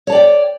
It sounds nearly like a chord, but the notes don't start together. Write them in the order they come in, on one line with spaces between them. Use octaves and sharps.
C#5 A5 D5 G5